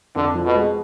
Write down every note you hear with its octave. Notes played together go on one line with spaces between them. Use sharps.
F2 D3
F3
B2
G#3